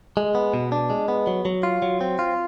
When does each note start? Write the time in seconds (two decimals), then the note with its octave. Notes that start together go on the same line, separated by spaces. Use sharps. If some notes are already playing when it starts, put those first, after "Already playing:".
0.17 G#3
0.35 B3
0.54 B2
0.72 D4
0.90 G#3
1.08 B3
1.27 F#3
1.45 F#3
1.63 F4
1.82 F#3
2.01 C4
2.19 F4